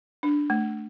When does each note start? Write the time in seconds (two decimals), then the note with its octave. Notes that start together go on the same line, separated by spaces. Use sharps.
0.23 D4
0.50 A3